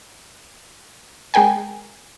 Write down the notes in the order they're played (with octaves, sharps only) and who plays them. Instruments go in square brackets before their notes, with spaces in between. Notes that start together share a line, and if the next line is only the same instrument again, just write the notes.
[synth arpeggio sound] G#3 G#4 A#4 G5 G#5